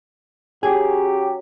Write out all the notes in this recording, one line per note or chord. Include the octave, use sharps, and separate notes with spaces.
F#3 C#4 G4 G#4